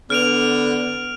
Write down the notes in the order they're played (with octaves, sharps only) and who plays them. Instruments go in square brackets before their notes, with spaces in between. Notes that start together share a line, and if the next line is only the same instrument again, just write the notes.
[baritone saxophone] D3 [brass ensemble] B3 [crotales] F6 D7 F7